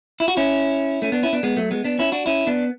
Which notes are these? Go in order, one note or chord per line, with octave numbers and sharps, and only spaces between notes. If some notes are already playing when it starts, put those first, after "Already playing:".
E4
F#4
C#4 E4
A3 C#4
B3 D4
C#4 E4
B3 D4
G#3 B3
F#3 A3
G#3 B3
B3 D4
C#4 E4
D4 F#4
C#4 E4
B3 D4